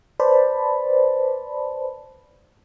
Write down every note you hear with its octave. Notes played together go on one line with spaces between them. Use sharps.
B4 C5 D5 A5 B5